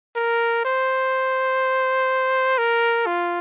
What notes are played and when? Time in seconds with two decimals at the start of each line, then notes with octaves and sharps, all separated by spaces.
0.16 A#4
0.65 C5
2.58 A#4
3.07 F4